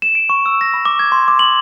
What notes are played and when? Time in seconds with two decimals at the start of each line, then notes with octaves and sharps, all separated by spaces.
0.02 E7
0.15 D7
0.30 C#6
0.46 E6
0.61 A#6
0.74 B5
0.85 D6
0.99 G#6
1.12 C6
1.28 D6
1.39 F#7